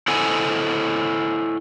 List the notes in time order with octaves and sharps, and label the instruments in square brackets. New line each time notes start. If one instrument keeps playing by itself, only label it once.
[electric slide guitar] E4 A4 C5 D#5 F#5 G#5